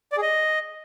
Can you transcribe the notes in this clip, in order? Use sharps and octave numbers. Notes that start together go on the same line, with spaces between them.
D5
G#4
D#5